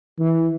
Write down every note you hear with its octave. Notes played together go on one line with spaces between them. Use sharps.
E3